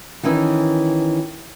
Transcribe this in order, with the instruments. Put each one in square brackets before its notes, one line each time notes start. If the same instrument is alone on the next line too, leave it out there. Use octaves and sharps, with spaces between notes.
[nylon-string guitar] D#3 E3 C#4 D#4 E4